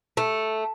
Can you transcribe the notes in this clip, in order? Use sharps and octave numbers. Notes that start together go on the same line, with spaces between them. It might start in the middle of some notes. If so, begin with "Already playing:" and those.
A3